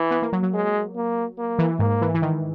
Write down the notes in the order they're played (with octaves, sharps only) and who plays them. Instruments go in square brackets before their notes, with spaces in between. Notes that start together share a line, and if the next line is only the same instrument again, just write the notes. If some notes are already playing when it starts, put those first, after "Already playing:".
Already playing: [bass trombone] E3
[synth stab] B3
A#3
F#3
F#3
[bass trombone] G#3
A#3
A#3
[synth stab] E3
[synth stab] G#2 [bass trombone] A#3
[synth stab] E3
E3
D#3